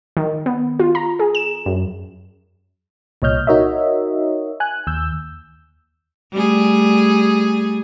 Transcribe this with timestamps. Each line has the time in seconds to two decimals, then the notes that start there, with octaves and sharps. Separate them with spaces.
0.17 D#3
0.46 B3
0.79 F4
0.95 A#5
1.19 G#4
1.35 E7
1.66 F#2
3.22 C2 A#2 C#5 D#5 F6 G6
3.47 D#4 F#4 A#4 C#5 D#5 E5
4.60 G#5 F#6
4.87 D#2 E6 G6
6.33 G3 A3 G#4